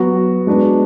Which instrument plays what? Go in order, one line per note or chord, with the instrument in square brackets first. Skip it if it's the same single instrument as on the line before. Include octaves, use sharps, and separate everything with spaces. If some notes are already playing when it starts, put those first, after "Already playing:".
Already playing: [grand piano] F#3 B3 F#4
G#3 B3 D4 F#4 B4